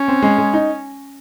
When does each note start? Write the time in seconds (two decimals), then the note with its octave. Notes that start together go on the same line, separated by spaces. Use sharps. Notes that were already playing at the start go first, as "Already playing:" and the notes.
Already playing: C#4
0.08 C4
0.23 G#3
0.38 G#3
0.54 D#4